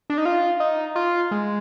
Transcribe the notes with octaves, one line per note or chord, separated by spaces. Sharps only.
D4
D#4
F4
D#4
F4
G#3